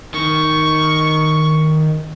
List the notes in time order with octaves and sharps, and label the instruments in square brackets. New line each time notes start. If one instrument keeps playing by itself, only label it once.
[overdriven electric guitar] D#3 [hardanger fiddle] C#6